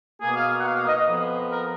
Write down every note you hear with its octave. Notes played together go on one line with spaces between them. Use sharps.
B2 A#3 G#4
F5
F#5
F5
F5
D#5
F2 F3 B3
A#4